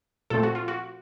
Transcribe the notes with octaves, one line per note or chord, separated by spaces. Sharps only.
A#2 F3 A3 C4 A4
F#4
F4
F#4